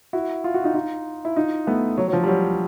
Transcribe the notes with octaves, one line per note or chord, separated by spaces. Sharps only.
E4 F#4
F4
F#4
D#4 F4
D#4 F4
E4
D#4 F4
A3 B3
F#3
F#3
F3
G3
F#3